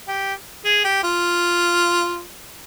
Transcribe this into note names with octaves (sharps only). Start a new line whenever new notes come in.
G4
G#4
G4
F4